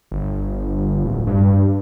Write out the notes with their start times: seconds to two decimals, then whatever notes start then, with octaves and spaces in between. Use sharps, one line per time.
0.12 G1
1.04 D1
1.27 G2